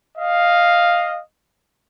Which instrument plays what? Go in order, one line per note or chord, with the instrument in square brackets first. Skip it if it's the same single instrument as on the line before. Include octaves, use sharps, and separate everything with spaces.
[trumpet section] D#5 F5